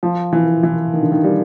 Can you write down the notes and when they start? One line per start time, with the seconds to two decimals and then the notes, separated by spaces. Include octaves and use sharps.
0.03 F3
0.33 E3
0.63 E3
0.93 D#3
1.03 D3
1.12 D#3
1.24 G3